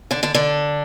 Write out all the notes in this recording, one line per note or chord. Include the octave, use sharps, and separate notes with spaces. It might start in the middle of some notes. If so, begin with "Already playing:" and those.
D3 D4
D3 D4
D3 D4